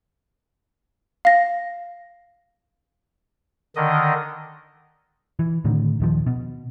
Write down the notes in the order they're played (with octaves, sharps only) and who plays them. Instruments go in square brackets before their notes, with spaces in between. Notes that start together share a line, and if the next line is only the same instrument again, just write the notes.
[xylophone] F5 A#6
[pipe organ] D3 D#3 D#5
[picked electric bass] E3
A2 D3 D#3
D#1 D#3 F3
B2